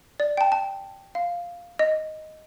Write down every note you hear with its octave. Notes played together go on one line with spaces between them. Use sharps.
D5
G5
A5
A5
F5
D#5